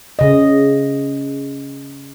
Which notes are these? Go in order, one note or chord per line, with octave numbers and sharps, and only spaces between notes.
C#3 D#5